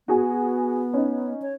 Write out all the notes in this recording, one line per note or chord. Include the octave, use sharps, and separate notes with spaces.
B3 F#4 G#4 G#5
C#4 D#4
C#5